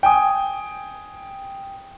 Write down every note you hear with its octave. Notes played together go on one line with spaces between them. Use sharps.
G5 G#5 D#6